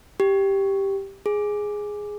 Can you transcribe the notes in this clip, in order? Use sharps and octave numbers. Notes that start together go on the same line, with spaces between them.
G4
G#4